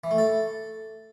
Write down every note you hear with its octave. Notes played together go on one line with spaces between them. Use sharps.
E3
A3
A4